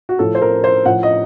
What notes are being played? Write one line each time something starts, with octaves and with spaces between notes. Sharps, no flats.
F#4
A2 F3 A4
C5
A#4
C5
A2 F3 F#5
D#5